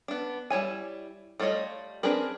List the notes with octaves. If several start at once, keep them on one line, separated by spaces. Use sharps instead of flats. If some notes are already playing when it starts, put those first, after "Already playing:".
B3 D4
G3 E4 C#5 G#5
G3 A3 F4 C#5 D#5
C4 D4 G#4 A#4 B4